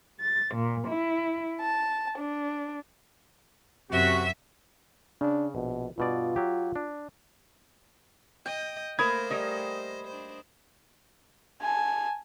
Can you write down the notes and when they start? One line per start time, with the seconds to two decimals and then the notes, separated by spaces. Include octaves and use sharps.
0.18 A6
0.53 A#2
0.86 E4
1.60 A5
2.17 D4
3.91 F#2 C3 F#4 E5
5.21 C#3 D4
5.55 A#1 B2
5.98 G2 B2 F4 D5
6.36 F#3 G4
6.76 D4
8.46 D#5 G5
8.99 A3 A#3 A#4 C5 B5 D#6 G#6
9.30 G3 A#4 D#5 G#5
10.07 D4 C5
11.62 G#5 A5